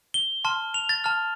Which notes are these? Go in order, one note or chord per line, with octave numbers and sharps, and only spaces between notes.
G7
A5 C6 F6
F7
A6
A5 F6